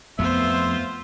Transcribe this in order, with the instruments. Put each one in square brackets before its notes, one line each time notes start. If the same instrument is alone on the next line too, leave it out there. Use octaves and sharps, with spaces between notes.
[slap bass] F2 A3 [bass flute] B3 [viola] F4 C5 [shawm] E5